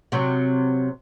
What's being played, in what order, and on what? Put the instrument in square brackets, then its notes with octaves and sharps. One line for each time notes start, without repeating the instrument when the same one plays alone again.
[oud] C3 F#3